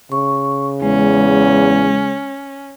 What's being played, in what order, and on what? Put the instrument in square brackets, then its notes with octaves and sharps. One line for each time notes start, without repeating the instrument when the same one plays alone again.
[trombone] C#3 [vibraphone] C#6
[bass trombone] E2 [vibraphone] G#3 [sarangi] C#4